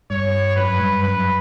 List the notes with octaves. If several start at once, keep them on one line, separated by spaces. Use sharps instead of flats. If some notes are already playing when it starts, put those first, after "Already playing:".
G2 C#5
F#2 B4
G2
F#2 B4